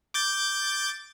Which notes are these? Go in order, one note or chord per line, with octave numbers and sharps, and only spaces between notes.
D6 G6 A6